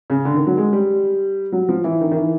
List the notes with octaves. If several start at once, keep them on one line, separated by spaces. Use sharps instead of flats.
C#3
D3
D#3
F#3
G#3
G3
F#3
F3
E3
D#3
D#3
E3